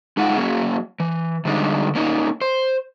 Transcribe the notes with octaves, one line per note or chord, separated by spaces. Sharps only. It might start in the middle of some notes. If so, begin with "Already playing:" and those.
G#3 D#4 F4 F#5
F#3 A#3 C#4 G#4
E3
D3 G3 G#3 D4 D#4
A#3 C#4 D#4
C5